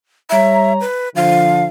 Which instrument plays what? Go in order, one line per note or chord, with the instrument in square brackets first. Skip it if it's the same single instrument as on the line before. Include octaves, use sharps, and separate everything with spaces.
[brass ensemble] G3 C#5 A#5 [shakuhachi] E5
[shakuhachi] B4
[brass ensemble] D3 F3 [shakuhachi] F5